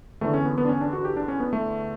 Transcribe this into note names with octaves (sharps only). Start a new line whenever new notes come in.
E2 D3 A3
C#4
B3
B3
D4
C#4
D4
F#4
G4
D4
C#4
B3
A3